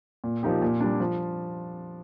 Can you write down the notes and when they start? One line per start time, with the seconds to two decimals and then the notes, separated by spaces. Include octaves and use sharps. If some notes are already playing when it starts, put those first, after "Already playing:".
0.24 A#2
0.43 F3 A#3 D#4 G4
0.62 A#2
0.81 G3 D4
1.00 F3